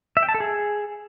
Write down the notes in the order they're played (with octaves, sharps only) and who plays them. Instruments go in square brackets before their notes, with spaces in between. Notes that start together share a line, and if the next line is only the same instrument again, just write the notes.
[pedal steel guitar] E5
G5
A5
A4
G#4